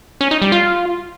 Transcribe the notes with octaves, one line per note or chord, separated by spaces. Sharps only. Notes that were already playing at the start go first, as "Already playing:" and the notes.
C#4
D#4
G3
F4